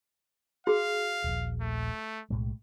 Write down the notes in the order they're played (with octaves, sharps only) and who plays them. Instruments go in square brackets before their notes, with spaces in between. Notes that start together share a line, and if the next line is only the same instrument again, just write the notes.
[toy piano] F#4 G#4 [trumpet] F5
[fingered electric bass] D#1 A#1
[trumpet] A3
[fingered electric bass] B1 A2 G#3